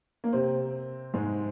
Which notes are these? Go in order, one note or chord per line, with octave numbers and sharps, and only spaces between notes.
A#3
C3 C4
G#2 G#3